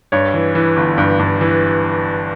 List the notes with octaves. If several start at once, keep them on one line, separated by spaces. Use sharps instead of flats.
G2 C#5
E3
E3
G1
G2
G2
E3